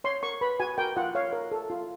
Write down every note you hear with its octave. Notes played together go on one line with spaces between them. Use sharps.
C#5 C6
A#4 C#6
B4 B5
F#4 G#5
A#4 G5
F4 F#5
C#5 F5
A#4
A4
F4